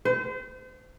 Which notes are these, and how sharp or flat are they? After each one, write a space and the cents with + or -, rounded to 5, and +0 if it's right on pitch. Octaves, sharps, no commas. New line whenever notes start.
C5 -35